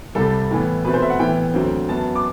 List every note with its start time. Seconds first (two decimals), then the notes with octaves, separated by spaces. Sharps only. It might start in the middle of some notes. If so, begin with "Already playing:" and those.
0.15 C2 C3 G3 A4
0.50 A2 E3 B3
0.85 B2 A3 C4 B4
0.94 C5
1.02 E5
1.10 F#5
1.19 A2 E3 B3 G5
1.54 D2 D3 F#3 C4
1.89 F#2 F#3 B3 A5
2.15 D6